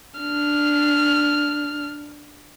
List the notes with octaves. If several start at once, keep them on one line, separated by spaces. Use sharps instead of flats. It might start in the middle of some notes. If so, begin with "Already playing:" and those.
D4 F6